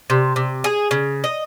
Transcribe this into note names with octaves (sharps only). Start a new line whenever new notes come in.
C3
C3
G#4
C#3
D#5